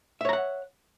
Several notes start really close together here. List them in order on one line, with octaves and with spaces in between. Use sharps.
E5 C#5 A#5 F#5